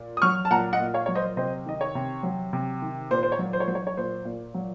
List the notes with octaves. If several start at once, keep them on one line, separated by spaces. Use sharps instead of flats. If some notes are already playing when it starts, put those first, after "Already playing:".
Already playing: A#2
D#6
F#3 C#6 F6
A5
A#2 F#5 A#5
D#5 F#5
A#2
C#5 F5
F#3 C#5
C5 D#5
C3 C5 D#5
D#3 D#5
C#5
C3
F#3
C3
D#3
A#2 C5
C5
C#5
F#3
C5
C#5
F#3 C5
C#5
C#5
A#2 C5
A#2
F#3